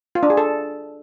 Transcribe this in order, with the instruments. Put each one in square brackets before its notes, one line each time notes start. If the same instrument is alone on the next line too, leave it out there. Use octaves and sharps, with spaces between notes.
[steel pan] F4
D4
G#4
A4